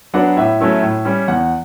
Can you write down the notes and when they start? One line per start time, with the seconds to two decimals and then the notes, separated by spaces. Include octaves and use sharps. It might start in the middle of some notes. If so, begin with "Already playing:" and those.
0.14 F#3 B3 D4 F#5
0.37 A2 E5
0.60 F#3 A3 C#4 E4
0.82 A2
1.05 G3 C#4
1.28 E2 F#5